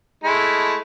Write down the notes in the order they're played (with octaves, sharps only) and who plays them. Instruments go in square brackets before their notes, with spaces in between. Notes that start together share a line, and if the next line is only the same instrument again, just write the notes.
[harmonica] G#3 A3 E4